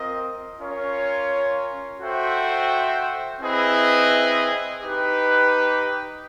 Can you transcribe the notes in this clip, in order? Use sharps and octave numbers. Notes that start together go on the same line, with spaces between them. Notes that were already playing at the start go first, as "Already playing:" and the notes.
Already playing: C4 F4 A#4 D#5
C#4 F4 A#4 C#5
F#4 A4 C5 E5 G5
C4 E4 G#4 B4 D#5
D#4 G4 B4